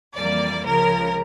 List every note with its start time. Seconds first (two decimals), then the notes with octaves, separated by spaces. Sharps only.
0.15 F2 E3 G3 A#3 D5
0.64 C#2 C#3 F3 A#4